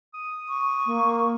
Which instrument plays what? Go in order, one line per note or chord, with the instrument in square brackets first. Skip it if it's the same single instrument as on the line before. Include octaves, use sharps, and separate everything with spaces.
[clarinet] D#6
[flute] C#6
[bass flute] A#3